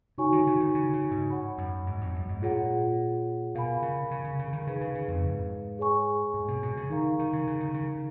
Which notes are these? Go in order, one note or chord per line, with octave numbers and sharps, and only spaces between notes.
C#3 D#4 F#4 C#5 G#5 C#6
D#3
C#3
D#3
C#3
C#3
G#2
C#5 F#5 B5
F#2
G#2
F2
F#2
G#2
A#2 F4 G#4 C#5 F#5
B2 A#4 F5 G#5 B5
C#3
C#3
C#3
C#3
D#3
C#3 D#4 G#4 B4 F5
C#3
C#3
F2
G#2
G#4 C#5 G#5 C#6
G#2
B2
B2
C#3
D#3 D#4 A#4 F5 A#5 C#6
D#3
C#3
C#3
D#3
C#3